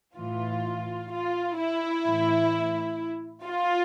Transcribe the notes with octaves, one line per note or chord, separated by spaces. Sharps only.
A2 E3 F4
F4
E4
A2 E3
F4